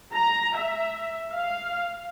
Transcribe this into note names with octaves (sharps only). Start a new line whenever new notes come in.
A#5
E5
F5